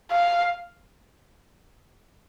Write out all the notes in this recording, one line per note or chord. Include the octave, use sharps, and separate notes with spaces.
F5